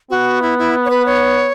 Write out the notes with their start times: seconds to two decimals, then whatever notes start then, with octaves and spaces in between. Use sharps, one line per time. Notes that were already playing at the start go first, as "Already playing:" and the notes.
0.10 B3 F#4
0.42 E4
0.59 E4
0.85 C#5
0.90 B4
1.06 C#5